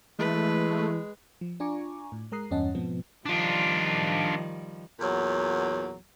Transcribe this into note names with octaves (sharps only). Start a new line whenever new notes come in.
E3 G#3 A3 B4
F3
D4 F4 G#5 A#5 C#6 D6
A2
G#3 A#4 A#5 D#6 F#6 C7
E2 G2 C#4 D#5 F#5 A5
G#2 B2 F3 B3 C4
D#3 F3 G3 D4 F4
E2 A#2 F#3